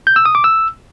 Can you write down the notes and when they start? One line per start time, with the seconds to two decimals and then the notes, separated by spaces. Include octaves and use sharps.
0.07 G6
0.16 E6
0.25 D#6
0.35 D6
0.44 E6